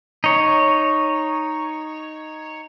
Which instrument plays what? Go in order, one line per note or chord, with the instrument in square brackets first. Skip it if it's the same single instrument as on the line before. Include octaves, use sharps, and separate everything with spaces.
[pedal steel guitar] D#4 C#5